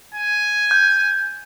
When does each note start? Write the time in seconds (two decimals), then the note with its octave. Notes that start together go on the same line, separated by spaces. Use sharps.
0.15 G#5
0.71 G6